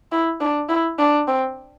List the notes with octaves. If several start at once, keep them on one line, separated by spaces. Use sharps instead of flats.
E4
D4
E4
D4
C4